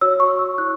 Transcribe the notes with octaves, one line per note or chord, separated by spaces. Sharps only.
F#4 C#5 E6
C#6
E6
E4 C#5 F#6